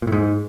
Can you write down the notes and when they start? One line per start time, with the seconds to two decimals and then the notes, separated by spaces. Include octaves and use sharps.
0.02 A#2
0.07 A2
0.12 G#2